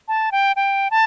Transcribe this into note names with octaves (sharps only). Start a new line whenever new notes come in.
A5
G5
G5
A5